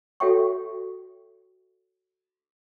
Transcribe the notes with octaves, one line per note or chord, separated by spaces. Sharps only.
F#4 A4 C#5 E5 G5 C#6